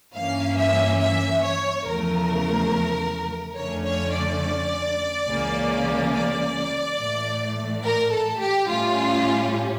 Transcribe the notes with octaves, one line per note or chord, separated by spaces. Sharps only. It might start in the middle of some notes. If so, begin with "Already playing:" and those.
G2 E3 A#3 C#4 F5
E5
E5
C#5
E2 C#3 F3 A3 A#4
F2 D3 A3 C#4 C#5
C#5
D5
C#2 C#3 E3 A#3 C#4
D5
A2 E3 A3
A#4
A4
G4
A2 G3 C#4 F4